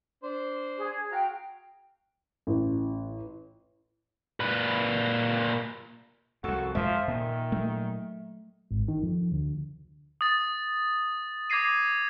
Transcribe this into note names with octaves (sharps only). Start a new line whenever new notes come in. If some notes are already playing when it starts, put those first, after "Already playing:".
D4 C5 C6
G#4
F#4 F5 G5 A#5
A1
A#2 B4
C2 F2 F#4 A4
F2 F3 G#3 E5
A#2 D#3
F#3 A3
G#1
D#3
F2
D2
D#6 A6
D6 G#6 A#6 C7 D#7